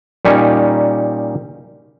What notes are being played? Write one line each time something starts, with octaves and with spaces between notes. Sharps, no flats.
A#2 G3 C#4 D#4